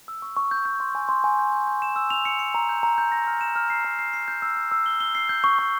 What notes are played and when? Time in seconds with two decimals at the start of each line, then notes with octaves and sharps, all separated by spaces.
0.08 E6
0.22 C#6
0.37 C#6
0.51 G6
0.65 G6
0.80 C6
0.95 G#5
1.09 C6
1.24 G#5
1.39 G6
1.52 G6
1.67 G6
1.82 E7
1.96 E6
2.10 F7
2.25 C#7
2.39 C#7
2.54 A#5
2.69 G6
2.83 A#5
2.98 G6
3.12 A#6
3.27 F6
3.41 E7
3.56 F6
3.70 C7
3.85 A#5
3.99 C7
4.13 C7
4.28 G6
4.42 E6
4.57 E6
4.72 E6
4.86 G7
5.00 G7
5.15 C7
5.29 G6
5.44 C#6
5.59 C#6